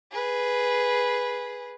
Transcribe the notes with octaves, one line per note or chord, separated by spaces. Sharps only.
G#4 B4